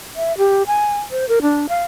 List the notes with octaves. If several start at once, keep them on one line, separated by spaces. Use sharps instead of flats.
E5
G4
G#5
C5
A#4
D4
F5